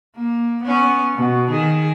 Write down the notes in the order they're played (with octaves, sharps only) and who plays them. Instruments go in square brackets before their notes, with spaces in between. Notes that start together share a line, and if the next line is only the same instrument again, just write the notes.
[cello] A#3
B3 C#4
B2
D#3 G#4